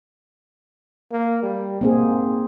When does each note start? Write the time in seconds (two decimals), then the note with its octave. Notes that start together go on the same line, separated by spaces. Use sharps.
1.12 A#3
1.43 G3
1.81 G#2 A#3 C4 G#4